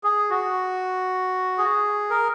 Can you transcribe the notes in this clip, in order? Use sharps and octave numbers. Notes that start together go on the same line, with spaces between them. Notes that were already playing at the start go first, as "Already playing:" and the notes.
G#4
F#4
G#4
A#4